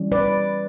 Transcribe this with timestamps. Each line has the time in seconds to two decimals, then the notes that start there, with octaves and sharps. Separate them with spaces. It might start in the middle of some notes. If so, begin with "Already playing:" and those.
Already playing: E3 G3 C#4
0.12 B4 D5